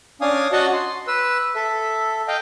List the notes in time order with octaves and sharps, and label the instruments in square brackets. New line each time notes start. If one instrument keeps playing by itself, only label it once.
[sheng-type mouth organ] C#4 D4 F5 G#5 D#6
F#4 C#5 D#5 F#5 A5
C6
B4 E6
A4 E5
D#5 F5 G5